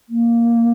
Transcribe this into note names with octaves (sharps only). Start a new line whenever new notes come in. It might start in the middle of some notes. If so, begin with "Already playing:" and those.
A#3